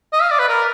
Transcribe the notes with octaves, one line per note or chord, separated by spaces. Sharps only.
D#5
F5
D5
B4
A#4